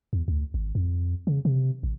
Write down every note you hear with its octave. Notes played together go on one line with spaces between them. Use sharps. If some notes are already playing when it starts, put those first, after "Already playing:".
E2
D2
G#1
F2
C#3
C3
A1